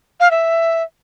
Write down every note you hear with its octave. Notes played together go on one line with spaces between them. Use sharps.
F5
E5